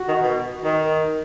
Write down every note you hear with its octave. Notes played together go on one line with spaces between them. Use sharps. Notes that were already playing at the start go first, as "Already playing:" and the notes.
Already playing: F#4
D#3
B2
D#3